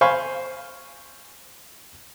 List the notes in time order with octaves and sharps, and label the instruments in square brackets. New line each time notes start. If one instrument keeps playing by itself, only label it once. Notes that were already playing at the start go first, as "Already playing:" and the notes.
[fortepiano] C5 F5 G#5 B5 C#6